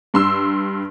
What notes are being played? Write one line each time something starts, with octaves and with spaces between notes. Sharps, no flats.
G2 C6 E6